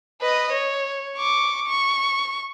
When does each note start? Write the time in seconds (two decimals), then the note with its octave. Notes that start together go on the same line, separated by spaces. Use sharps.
0.21 B4 D#5
0.52 C#5
1.16 C#6 D6
1.66 C#6